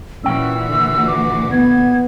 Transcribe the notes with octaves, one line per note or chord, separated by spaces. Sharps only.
A#2 E3 C#4 F#4 G5 E6
D3
D6
B3 G#6